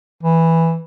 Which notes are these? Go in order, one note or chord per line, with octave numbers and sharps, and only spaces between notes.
E3